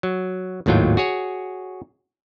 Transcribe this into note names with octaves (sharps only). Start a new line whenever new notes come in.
F#3
G#1 D#2 A2 F#3 F4 G5
F#4 G#4 C#5